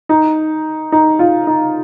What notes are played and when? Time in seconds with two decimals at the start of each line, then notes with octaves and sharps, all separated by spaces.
0.09 D#4
0.92 D#4
1.19 F4
1.47 D#4